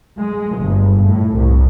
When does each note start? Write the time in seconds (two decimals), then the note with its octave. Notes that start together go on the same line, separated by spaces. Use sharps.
0.19 G#3
0.59 G1
1.04 A2
1.36 C2